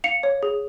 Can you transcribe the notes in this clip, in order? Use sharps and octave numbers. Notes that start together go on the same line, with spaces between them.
F5 C#7 F7
C#5
G#4